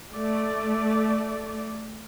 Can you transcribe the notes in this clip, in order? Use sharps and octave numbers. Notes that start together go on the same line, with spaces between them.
A3 D5